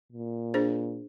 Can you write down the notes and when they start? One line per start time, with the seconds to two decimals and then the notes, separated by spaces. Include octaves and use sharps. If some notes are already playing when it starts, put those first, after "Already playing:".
0.12 A#2
0.54 D4 G#4 C5